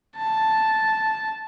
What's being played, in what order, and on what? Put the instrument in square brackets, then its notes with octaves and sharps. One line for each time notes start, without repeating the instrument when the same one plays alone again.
[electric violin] A5